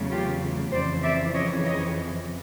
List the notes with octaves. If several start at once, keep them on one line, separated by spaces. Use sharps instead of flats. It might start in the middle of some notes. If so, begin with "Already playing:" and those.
Already playing: E2 C#3 F#3 A3
F4 G4
F2 C#3 E3 C5 D5
D5 E5
C#5 D#5
C#5 D#5